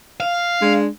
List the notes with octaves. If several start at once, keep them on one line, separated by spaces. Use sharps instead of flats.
F5
G#3 D4